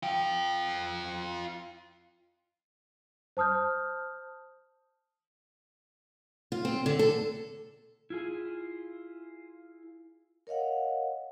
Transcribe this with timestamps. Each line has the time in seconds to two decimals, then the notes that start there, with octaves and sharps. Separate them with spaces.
0.03 F4 G5
3.37 C5 A5 D#6 F6 G6
6.52 F4
6.65 C4
6.86 D3
6.99 A4
8.10 E4 F4 G#4
10.47 A#4 C#5 D#5 F5 F#5